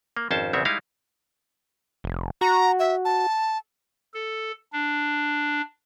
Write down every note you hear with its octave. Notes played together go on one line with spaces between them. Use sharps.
A#3
G#1 F2 C#4 C5 A5
A#1 E2 C#3 C4 C#5 E5
G3 G#3 D#4 E4 F5
F1
F#4 A#5
E5
A5
A4
D4